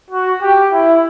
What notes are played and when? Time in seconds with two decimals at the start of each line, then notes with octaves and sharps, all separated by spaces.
0.10 F#4
0.42 G4
0.73 E4